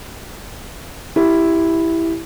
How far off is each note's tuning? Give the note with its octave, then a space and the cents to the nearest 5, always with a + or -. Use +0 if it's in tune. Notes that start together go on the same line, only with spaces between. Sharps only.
E4 +0 G4 +0